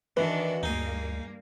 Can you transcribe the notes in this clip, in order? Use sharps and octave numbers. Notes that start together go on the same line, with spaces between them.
D#3 E3 D4 F#4 B4
D2 G2 A#3 D#4 G#4